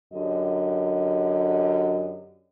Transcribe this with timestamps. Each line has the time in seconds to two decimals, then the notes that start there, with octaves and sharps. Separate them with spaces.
0.13 F#2 D3 G4 D#5